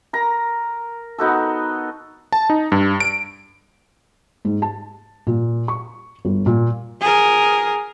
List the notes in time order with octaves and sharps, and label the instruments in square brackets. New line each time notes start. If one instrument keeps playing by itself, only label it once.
[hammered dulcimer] A#4 A#5
B3 D#4 F#4 A4
[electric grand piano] A5
D#4
G2
D7
[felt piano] G#2
A5
A#2
C#6
G1
A#2
[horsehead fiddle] G#4 A#4